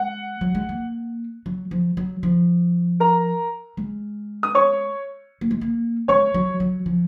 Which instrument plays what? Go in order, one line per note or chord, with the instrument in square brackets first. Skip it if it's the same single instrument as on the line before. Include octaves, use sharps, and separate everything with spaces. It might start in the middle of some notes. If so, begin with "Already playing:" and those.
Already playing: [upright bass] G#3 [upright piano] F#5
[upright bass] F#3
G#3
A#3
F#3
F3
F#3
F3
[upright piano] A#4 A#5
[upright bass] G#3
[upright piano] D#6
C#5 C#6
[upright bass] A#3
G#3
A#3
[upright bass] G#3 [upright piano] C#5 C#6
[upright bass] F#3
F#3
F3